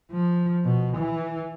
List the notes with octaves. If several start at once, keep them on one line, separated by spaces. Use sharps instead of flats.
F3
B2
E3